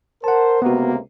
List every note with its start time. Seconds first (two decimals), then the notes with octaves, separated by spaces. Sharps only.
0.24 A#4 C5 F#5 A5
0.62 C#2 C3 A#3 B3 F#4